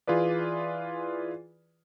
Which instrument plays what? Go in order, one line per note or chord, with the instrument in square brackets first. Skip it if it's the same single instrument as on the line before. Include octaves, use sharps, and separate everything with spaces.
[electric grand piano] E3 F4 G#4 B4 D5